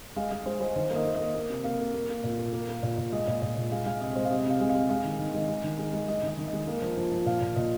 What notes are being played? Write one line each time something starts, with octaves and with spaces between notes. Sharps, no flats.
G#3 F5
G#3 D#5
G#3 C5
G#3 C5
D#3 C5
A#3
D#5
A#3
D#5
A#3
A#3
C3
A#3 F5
A#3
A#3
A#3
A#2
A#3
A#3
A#3
A#2
A#2
G#3 D#5
A#2
A#2
A#2
G#3 F5
G#3 F5
C3 D#5
G#3 C5
F5
C3 D#5
C3 F5
G#3
F5
G#3
G#3 F5
D#3
D#3
G#3
G#3
D#3
G#3
G#3
G#3 D#5
D#3 D#5
D#3
D#5
G#3
A#3
F3
F3
F3
A#2 F5
A#2
A#2 D#5